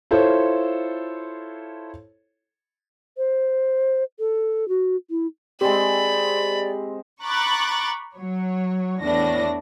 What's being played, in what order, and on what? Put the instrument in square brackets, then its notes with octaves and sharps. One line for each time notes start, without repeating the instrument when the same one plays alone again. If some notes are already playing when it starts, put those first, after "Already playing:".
[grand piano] E4 F4 A4 C5 C#5
[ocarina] C5
A4
F#4
E4
[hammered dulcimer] G#3 C4 [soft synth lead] G4 [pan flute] D5 [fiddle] B5
[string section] A#5 B5 C#6 D6 F#6 A6
F#3 C#5
E2 A2 E3 D4 A#6